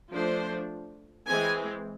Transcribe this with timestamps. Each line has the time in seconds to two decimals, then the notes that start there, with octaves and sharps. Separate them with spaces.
0.12 F3 A3 D4 C5
1.27 E3 G#3 C4 G#5